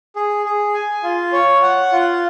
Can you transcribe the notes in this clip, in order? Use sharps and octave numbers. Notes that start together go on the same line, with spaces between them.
G#4
G#4
G#5
F4
C#5
F#5
F4